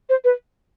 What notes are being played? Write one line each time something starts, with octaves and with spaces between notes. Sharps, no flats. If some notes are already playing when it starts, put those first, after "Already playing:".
C5
B4